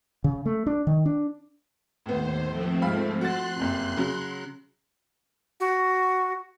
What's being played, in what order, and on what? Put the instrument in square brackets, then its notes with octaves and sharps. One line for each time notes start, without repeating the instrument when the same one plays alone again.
[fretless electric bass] C#3
A3
D4
D#3
D4
[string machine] D#2 C5 [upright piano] A2 B3
[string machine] F3 A3 C4
[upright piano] G#2 F5 B5
[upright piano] F#4 A6 [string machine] C6 F#6
[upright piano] F#1 F2 C3
C#3 F#3
[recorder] F#4